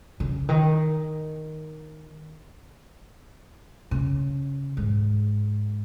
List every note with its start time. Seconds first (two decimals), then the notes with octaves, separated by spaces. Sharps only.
0.20 C#3
0.49 D#3
3.91 C#3
4.77 G#2